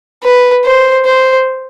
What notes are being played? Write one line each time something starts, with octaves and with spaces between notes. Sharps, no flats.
B4
C5
C5